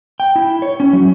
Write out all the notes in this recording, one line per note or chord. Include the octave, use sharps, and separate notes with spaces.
G5
E4
C#5
C#4
F#3